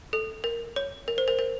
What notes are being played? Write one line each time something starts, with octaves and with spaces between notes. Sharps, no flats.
A4
A#4
C#5
A#4
C5
A#4
A#4